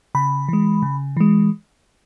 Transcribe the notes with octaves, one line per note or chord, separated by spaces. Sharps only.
C#3 B5
E3 G#3
C#3
E3 G#3